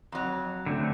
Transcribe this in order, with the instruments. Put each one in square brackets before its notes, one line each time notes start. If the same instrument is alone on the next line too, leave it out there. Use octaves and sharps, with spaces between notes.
[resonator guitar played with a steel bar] F2 F#3
[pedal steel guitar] D3 A3 C4